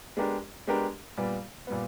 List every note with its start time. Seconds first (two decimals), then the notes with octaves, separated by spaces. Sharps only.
0.17 G#3 B3 D4 G4 A#4
0.67 G#3 B3 D4 G4 A#4
1.17 A#2 G3 B3
1.67 A#2 G3 B3